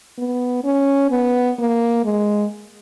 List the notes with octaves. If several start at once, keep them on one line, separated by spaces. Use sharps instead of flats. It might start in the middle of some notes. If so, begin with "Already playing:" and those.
B3
C#4
B3
A#3
G#3